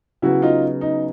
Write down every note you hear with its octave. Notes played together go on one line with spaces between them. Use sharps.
C#3 F#3 B3 E4 F#4
D#4 F4
D#4